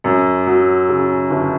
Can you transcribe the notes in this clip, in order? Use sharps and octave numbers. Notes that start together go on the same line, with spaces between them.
F#2
F#3
C#3
G1